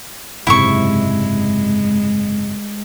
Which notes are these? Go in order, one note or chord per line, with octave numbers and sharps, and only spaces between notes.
F#1 G#2 C3 G#3 E4 E5 C#6